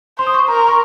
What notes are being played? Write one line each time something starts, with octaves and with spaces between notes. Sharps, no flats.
C5 C6
D#6
C#6
A#4 A#5
C6
C#6